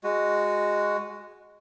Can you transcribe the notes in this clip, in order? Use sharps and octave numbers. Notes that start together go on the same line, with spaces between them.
G#3 F#4